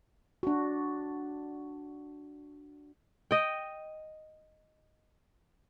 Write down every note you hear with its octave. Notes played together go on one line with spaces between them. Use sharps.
D4 F#4
D#5 G5